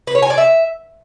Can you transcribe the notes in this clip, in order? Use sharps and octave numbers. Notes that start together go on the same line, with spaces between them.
B4
C#5
G#5
D5
E5